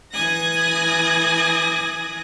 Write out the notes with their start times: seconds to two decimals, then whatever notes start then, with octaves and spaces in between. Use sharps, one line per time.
0.12 E3 G#5 D#6 F#6 A#6